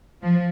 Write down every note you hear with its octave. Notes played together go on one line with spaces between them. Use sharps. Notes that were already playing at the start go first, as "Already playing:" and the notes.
F3